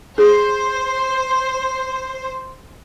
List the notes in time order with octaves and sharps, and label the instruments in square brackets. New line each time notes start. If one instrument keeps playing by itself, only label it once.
[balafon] G#4 [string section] C5